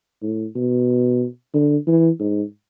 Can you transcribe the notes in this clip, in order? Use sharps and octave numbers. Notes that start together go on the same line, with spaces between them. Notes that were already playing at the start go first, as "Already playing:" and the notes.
A2
B2
D3
E3
G#2